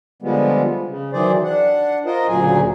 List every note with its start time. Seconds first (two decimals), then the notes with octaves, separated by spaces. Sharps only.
0.22 D3 F3 G3 G#3 B3
0.87 C#3
1.13 D#3 E3 F#3 G#4 C5 D5
1.44 D4 F#5
2.06 F4 A#4 C5 D#5
2.28 D2 A#2 C#3 F#3 G#4 G#5